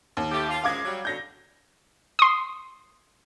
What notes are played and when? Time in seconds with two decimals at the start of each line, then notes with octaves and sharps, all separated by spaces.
0.17 D#2
0.31 A3 G4
0.48 F4
0.64 F#2 F3 G#3 F5 D6 G#6
0.84 F#3 G3
1.05 B2 D3 F#3 G6 A#6
2.19 C6 D#6